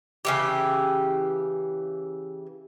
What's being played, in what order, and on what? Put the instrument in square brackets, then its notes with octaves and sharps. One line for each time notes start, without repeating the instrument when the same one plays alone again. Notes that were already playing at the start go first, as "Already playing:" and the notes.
[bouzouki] C#3 E3 G4